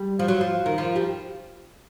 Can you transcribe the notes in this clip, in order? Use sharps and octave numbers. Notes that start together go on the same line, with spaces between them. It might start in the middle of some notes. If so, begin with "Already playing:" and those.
Already playing: G3
F3
F#3
F3
D#3
F3
G3